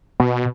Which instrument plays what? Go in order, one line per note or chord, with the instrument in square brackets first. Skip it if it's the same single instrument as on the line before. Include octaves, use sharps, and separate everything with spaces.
[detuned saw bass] B2